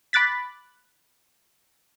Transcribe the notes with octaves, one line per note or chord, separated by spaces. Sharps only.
B5 D6 F#6 A6 B6